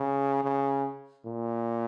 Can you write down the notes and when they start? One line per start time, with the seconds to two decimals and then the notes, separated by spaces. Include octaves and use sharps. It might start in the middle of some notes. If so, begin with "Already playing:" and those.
Already playing: C#3
0.44 C#3
1.25 A#2